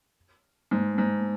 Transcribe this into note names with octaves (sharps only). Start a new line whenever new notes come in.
G#2
G#2